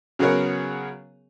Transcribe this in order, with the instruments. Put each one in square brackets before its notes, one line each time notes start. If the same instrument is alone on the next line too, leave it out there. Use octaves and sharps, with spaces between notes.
[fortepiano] C#3 F#3 B3 G#4 A#4 C#5